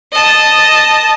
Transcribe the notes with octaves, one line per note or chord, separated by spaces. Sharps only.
D#5 A5